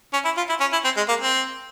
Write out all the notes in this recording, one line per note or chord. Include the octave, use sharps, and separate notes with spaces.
C#4
E4
F4
E4
C#4
E4
C4
G#3
A#3
C4